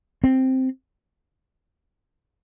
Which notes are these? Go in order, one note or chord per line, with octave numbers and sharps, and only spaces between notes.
C4